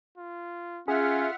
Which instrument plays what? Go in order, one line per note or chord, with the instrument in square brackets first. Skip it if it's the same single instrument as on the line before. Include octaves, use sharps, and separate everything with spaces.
[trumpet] F4
[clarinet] C#4 [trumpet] F4 [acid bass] G#4 [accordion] E5 F#5 F6